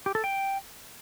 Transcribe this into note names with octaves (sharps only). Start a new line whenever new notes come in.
G4
A4
G5